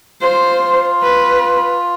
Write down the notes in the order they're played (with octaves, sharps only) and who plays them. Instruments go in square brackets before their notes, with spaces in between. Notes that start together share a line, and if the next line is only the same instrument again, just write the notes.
[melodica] F4 [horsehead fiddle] C5
[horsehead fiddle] B4